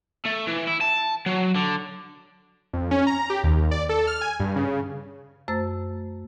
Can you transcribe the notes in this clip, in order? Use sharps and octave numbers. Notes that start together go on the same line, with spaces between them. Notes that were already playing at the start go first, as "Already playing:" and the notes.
A3
E3
E4
A5
F#3
D3
F2
C#4
A#5
G4
D#2
D5
A4
F6
G#5
G2
C#3
F#2 A3 C5 E6 A6